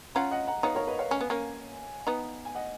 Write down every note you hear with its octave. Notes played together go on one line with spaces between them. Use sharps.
C#4 F4 F#5 A#5
D#5 F#5
F#5 A#5
B3 D#4 C#5 F5
A#4 C#5
B4 D#5
C#5 F5
C#4 F5 G#5
B3
A#3 C#4
B3 D#4
G#5
D#5 F#5